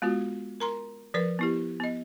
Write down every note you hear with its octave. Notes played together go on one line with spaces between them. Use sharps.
G#3 B3 F4 F#4
A#4 A#5 C6
F3 A#4 B4 D5
B3 E4 G4
B3 D#5